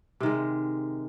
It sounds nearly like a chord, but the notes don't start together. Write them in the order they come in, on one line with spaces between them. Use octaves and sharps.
C3 D#3 G#3